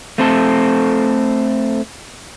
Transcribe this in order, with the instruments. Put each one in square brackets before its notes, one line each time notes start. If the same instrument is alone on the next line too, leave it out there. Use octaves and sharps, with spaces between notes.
[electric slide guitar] A3 C4 A4